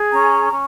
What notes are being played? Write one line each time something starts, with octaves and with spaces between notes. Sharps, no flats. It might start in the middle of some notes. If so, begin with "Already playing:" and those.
Already playing: G#4
C#4 A#5
C#4